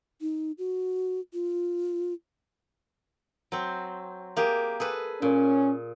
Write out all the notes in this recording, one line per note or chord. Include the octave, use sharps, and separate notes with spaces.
D#4
F#4
F4
F#3 C4
A#3 G4 G#4
G#4 A4 B4
A#2 C#4